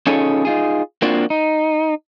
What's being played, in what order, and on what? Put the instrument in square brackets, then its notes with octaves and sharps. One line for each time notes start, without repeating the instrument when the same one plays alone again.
[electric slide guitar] C#4 D#4 F4 G#4 A4 C#5
D#4 F4 G#4
A#3 C4 D4 F4 F#4
D#4